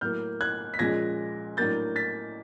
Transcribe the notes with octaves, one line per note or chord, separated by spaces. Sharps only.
A2 F#3 A#3 F6 G6
F#6 G#6
B6
A#2 F3 G#3 C#4 G#6 A#6
A2 F#3 A#3 D4 G6 A6
A6 B6